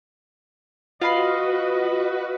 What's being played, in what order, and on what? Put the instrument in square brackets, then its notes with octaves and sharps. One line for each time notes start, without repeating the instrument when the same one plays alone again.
[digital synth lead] F4 [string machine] F#4 B4 [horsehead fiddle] D#5 [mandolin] F5 B5 C6